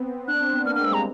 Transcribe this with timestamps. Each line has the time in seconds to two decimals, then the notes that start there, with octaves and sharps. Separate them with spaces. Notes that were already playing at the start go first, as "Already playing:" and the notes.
Already playing: B3 C4
0.28 D4 F#6
0.40 C4
0.53 B3
0.65 A#3 F6
0.76 G#3 F6
0.85 E6
0.91 G3 A#5